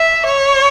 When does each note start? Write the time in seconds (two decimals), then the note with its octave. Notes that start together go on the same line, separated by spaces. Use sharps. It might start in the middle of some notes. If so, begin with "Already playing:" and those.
Already playing: E5
0.26 C#5